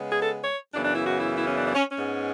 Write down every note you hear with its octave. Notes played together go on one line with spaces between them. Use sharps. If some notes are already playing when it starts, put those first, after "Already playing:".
Already playing: C#3 G#3 B3
G#4
A4
C#5
F#2 C#3 E3 B3 D4
D4
E4
F#4
E4
E4
C#4
D4
D4
C#4
C#4
G#2 G#3 B3